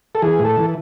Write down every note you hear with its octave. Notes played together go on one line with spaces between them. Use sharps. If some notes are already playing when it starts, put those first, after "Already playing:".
A4
E3 G#4
A2
A4
E3